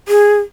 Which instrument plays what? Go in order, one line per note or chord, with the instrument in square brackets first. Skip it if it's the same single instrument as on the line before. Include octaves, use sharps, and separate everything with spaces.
[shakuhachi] G#4